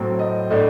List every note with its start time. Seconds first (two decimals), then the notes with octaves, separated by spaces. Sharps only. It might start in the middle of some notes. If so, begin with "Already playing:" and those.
Already playing: A2 F#3 C4 G5
0.19 D#5
0.50 A2 A3 D4 D#5